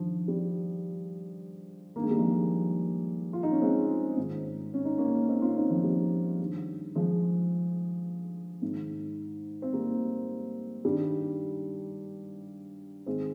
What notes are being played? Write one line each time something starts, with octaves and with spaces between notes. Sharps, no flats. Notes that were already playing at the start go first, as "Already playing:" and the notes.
Already playing: G2 D#3 F3
G3
G2 D#3 G#3 A#3
G3
F3 G#3
F4
D#4
C#4
G#3 C4
G#2 D#3
C#4
D#4
A#3 C#4
C4 D#4
C#4 F4
C4 D#4
F3
G3
G2 D#3
F3 G#3
G#2 D#3
C4
G3 A#3
G2 D#3 G3
G#2 D#3 G#3 C4